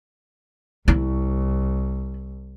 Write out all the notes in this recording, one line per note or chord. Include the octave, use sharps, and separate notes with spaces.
C2 E4